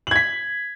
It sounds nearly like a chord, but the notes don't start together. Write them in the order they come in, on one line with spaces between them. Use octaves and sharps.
F#7 G#6 B6